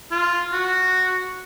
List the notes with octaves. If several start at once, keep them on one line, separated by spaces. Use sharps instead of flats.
F4
F#4